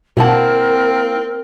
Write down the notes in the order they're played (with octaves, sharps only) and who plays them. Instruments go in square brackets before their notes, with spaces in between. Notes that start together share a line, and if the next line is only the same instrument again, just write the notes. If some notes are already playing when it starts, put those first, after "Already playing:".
[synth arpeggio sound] B2 A5 [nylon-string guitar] A#3 E4 F#5 [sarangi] C4 [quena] A#4